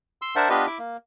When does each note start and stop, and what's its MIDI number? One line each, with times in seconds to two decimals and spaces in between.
0.22 0.36 84
0.22 0.36 88
0.36 0.49 62
0.36 0.49 70
0.36 0.49 72
0.36 0.49 76
0.36 0.49 78
0.36 0.49 81
0.49 0.67 59
0.49 0.67 62
0.49 0.67 65
0.49 0.67 67
0.49 0.67 71
0.49 0.67 75
0.67 0.78 64
0.67 0.78 76
0.67 0.78 86
0.78 0.97 58